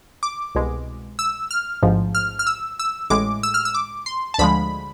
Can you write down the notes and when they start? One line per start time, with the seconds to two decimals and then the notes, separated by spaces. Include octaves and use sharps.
0.23 D6
0.55 C2 B2 G#3
1.19 E6
1.51 F6
1.83 A1 G#2 F3
2.15 F6
2.39 F6
2.47 E6
2.79 E6
3.10 A1 A2 G#3 D6
3.43 E6
3.54 F6
3.65 E6
3.74 D6
4.06 C6
4.34 A5
4.39 D2 D3 F3 G#3 B5